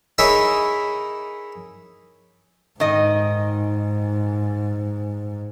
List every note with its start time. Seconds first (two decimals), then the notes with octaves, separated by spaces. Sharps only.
0.18 D#4 E4 G#4 A#4 C#5 E5
2.80 G#2 D#3 D#5